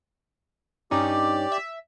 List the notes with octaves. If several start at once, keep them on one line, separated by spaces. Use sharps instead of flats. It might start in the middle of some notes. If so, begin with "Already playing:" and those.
G2 C#4 D#4 G4 D5
E5